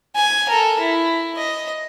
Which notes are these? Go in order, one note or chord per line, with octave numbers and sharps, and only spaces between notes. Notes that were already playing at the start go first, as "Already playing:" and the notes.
G#5
A4 A#4
E4
D#5